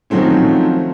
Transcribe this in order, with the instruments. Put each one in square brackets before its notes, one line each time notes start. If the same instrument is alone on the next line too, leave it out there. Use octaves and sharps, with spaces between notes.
[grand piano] D#3 F3 F#3 A3 C4 C#4